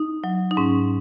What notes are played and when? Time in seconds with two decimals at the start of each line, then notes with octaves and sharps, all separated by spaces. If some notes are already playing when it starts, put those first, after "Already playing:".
Already playing: D#4
0.24 F#3
0.51 D#4
0.57 G#2 C#4